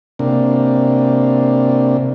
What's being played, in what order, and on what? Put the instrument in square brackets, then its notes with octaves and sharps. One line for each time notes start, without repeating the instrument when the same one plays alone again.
[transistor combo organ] C3 A#3 D4